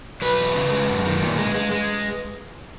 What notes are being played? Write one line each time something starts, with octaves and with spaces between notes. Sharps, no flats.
F#3 B4
E2
C#3
G#3
F#2
D#3
A#2
G#3
G#3
G#3